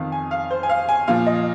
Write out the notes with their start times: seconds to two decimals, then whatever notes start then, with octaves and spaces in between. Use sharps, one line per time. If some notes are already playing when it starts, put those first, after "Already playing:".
Already playing: F2 D#3 F5
0.12 G#5
0.31 F5
0.50 C5
0.63 G#5
0.69 F5
0.89 G#5
1.08 A#2 F3 F5
1.27 D#5